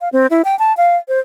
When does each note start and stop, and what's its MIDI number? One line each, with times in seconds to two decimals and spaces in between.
0.01 0.09 77
0.13 0.27 60
0.30 0.42 64
0.45 0.58 79
0.59 0.76 81
0.77 0.97 77
1.08 1.19 72